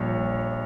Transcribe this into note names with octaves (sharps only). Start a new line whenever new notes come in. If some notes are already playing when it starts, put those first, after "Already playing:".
Already playing: A#1 G3 C#5